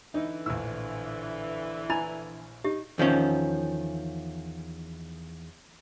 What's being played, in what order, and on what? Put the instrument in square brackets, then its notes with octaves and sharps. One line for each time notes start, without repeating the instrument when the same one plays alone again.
[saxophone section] D3 E3 [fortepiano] D#4
[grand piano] A#1 A2 [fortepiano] E6
[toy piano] E4 B5 [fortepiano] G#5
[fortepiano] D#4 [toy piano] G4
[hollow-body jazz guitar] E2 D#3 F3 C#4